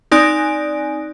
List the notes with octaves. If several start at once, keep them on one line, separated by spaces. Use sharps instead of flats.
C4 D#4 D5 G#5 F#6 D7